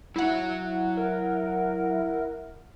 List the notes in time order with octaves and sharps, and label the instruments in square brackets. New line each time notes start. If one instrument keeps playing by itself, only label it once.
[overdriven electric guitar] F#3 C#5 [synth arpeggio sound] E4 F#5
[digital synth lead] A#4